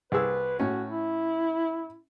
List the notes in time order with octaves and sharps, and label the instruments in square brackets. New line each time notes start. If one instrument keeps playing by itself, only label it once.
[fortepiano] C2 G#4 E6 [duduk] B4
[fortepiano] A2 C#4 [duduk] F#4
[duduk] E4